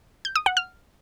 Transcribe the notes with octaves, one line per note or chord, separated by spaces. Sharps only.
G6
D#6
F#5
F6